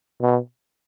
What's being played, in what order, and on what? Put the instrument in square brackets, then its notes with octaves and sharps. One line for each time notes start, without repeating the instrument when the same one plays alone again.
[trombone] B2